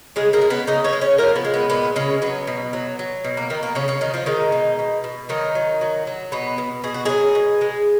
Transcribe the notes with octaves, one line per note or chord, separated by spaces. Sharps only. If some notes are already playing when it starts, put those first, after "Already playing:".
C#3 G#3 G#4
A#3 A#4
G#3
B3 B4
C#3 D#4 D#5
C#4 C#5
G#3
C#4 C#5
F3 A#3 A#4
B3
G#3
B3
A#2 B3
C#3 G#3 C#4
F#3 B3
B2
F#3
F#3
B2
A#3
B2 D#3 D#4
A#3
C#3 F#3 C#4
C#3 C#4
D#3 F#3 D#4
F3 F4
D#3 G#3 D#4
B2
B2
B2
D#3 F#3 D#4
F#3
F#3
F#3
B2 B3
B2
B2 G#4
F#4
F#3 G#3 G#4
B2
G#3